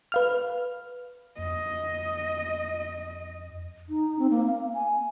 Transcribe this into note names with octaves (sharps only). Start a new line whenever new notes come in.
B4 F5 F6
F2 D#5
D#4
C4
A#3
F5
G#5